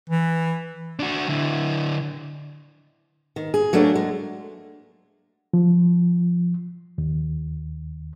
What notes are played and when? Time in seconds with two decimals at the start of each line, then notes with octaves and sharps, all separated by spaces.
0.10 E3
0.99 D4 F#4
1.28 D3 E4
3.36 D#3
3.54 G#4
3.73 F#3 A3 A#3 D4
3.95 G#3
5.53 F3
6.98 D#2